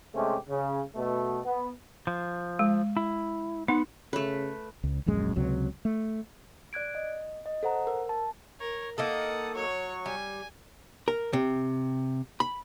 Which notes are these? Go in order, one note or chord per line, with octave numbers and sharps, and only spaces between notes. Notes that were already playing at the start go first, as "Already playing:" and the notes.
C3 G#3 A3 C#4 G4 C5
C#3
B2 A3
B3
F3
G#3
E4
B3 D#4 F#5
C#3 A3 B4
C#2
D#1 A#1 F#2 G#3
C#2 C3 F#3
A3
D5 F#6 G#6 D7
D#5
D#5
A4 C5 F#5 A#5
A#4
A5
A#4 C#5
A#3 D#4 A4 F#5 A5 D#6
F#3 C#5 C#6
G3 G#5
A#4
C3
B5